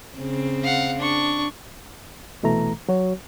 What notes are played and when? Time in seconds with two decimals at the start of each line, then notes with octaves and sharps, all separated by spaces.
0.18 C#3 C4
0.63 F5 F#5
0.99 D4 C#6
2.43 C2 B2 E3 A3 A#5
2.89 F#3 F#4 C#5